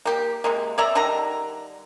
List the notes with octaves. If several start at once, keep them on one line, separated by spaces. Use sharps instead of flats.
A#3 G4
C3 G#3 A#3
C#5 D5 E5 A#5
D3 D#3 G3 A#5